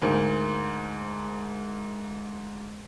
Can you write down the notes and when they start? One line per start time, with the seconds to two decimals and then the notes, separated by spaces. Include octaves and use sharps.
0.02 D2 G#2 A#3